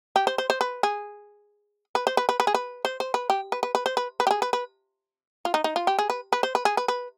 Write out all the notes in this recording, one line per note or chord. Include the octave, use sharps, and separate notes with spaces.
G4
C5
C5
C5
B4
G#4
B4
C5
B4
B4
B4
G#4
B4
C5
C5
B4
G4
B4
B4
B4
C5
B4
B4
G4
G#4
B4
B4
F4
D#4
D#4
F4
G4
G#4
B4
B4
C5
B4
G#4
B4
B4